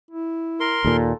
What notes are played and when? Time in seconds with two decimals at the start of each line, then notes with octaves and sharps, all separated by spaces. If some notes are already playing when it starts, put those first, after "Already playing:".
0.11 E4
0.60 A#4 C6
0.85 D#2 A#2 A4